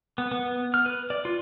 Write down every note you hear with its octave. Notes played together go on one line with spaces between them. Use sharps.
B3
B3
F6
B4
D5
F4